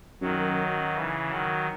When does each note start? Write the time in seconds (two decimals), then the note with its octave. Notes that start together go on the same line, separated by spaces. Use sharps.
0.21 F#2 D#3 F#3
0.93 C#3 E3
1.29 D#3 F#3